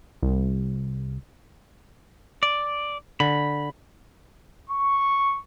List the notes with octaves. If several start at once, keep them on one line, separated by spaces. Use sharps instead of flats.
C2
D5
D3 B5
C#6